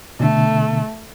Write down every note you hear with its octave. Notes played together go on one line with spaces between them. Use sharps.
B2 D3 A3